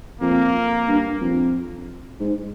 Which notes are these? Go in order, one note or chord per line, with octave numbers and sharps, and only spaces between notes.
F2 A#3
G2
F2
G#2